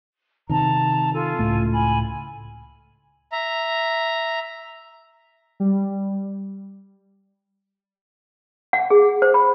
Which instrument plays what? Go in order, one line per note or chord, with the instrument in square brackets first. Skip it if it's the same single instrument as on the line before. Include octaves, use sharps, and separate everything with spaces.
[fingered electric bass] C3 D#3 [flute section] A5 A#5
[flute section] F4 A4 G#5
[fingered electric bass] C#2 A2 A3
[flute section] G#5 B5
[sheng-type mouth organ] E5 A#5
[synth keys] G3
[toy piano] F#5
G#4
C5
B5